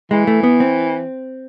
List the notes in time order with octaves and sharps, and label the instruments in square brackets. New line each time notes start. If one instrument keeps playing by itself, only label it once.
[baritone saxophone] E3 [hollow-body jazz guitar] G#3
[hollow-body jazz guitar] A3
B3
C4